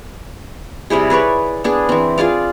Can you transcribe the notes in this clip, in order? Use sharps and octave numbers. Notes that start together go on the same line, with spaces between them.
C3 G3 E4 G#4
G#4 B4 C#5 D5
B3 D4 G#4
E3 C4
F4 G#4 D5 F5